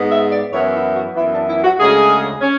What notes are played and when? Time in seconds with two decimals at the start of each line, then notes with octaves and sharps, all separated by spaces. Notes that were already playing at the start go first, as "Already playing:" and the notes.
Already playing: G#2 G#3 B3
0.11 E5
0.31 D5
0.52 F#2 E3 B3 C#5
0.74 E4
0.95 F#4
1.15 F#2 E3 B3 E4
1.32 D4
1.47 E4
1.63 F#4
1.79 D2 C#3 G#3 C#4 G#4
2.41 C#4